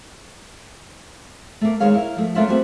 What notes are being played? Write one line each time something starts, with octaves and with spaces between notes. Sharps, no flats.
A3 A#3
D#2 G#3 A#4 C#5 F5
E4 A#4 F5
F3 A3
A3 A#3 C#4 F4 E5 F#5
G3 A3 B3 C4 F#4 G4